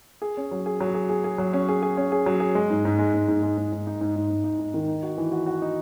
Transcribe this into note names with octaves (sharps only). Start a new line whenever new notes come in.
G#4
C#4
F#3
G#4
F#3
G#4
G#4
G#4
F#3
C#4
G#4
G#4
C#4
G#4
F#3
G#4
G#3
G#2
G#2
G#3
G#2
G#2
G#3
G#2
G#2
D#4
G#2
G#2
G#2
D#4
D#4
D#3
D#4
F#4
E3
F#4
F#4
D#4